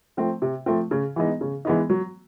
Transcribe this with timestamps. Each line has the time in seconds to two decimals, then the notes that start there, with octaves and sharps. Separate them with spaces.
0.17 F3 A3 C4
0.42 C3
0.66 F3 A3 C4
0.91 C#3
1.16 E3 G#3 B3 D#4
1.41 C#3
1.65 E3 G#3 B3 D#4
1.90 F#3